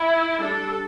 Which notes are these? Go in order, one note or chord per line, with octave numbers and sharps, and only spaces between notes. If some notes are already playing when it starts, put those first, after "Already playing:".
Already playing: E4
G3 D4 A4